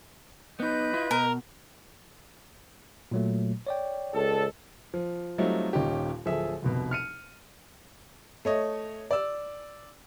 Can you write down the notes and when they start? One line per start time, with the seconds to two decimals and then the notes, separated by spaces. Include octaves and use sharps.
0.60 B3 D#4 B4 D#5 G6
0.94 E4 F4
1.11 B2 A#4
3.11 A#2 F#3 A3
3.67 C#5 D5 G5
4.14 C#2 A4
4.94 F3
5.38 F#3 G3 A3 C4 D#4 F4
5.73 D#1 A#2 C#4 D#4 G4
6.25 D1 F3 G#4 A4 E5
6.62 F1 C2 B2
6.91 F6 C#7 D#7
8.45 A3 C#5 D#5
9.11 D5 E6